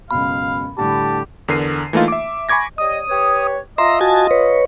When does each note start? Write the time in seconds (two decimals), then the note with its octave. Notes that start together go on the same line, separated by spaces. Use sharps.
0.11 C#2 F#2 B2 F5 B5
0.78 A2 D3 G3 G4 A5
1.48 E2 D3 A#4 C7 D#7
1.93 E3 A3 A#3 D#4 F4
2.08 E5 D6
2.49 G#5 B5 C#6 D6 G#6 A#6
2.78 G3 C#5 D#5 D#6
3.09 G4 B4 C#5
3.78 F4 D#5 E5 A#5 C6
4.01 F#4 G#5 A5
4.31 B4 C#5